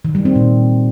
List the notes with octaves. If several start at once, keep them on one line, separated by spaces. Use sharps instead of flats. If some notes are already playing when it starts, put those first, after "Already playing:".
D#3
G3
C4
A#2